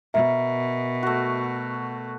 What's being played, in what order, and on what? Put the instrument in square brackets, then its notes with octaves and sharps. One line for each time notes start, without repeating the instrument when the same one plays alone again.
[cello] B2 [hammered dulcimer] A#4 [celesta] E5
[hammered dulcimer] A3 F#4